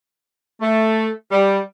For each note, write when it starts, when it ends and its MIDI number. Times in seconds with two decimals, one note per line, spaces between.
0.62 1.08 57
1.32 1.58 55